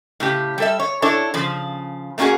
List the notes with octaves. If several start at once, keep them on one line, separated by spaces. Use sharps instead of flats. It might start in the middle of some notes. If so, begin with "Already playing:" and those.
A2 C#3 G4
G3 A4 E5
C#5
D4 E4 A4 C#5
C#3 F3
A3 A#3 C#4 F4 F#4 G#4